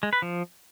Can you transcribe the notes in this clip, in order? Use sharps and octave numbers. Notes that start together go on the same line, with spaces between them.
G#3
B4
F3